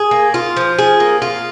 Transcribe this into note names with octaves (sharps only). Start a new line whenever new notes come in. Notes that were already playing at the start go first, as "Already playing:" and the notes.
Already playing: G#4
A#3
F4
F3
G#4
A#3
F4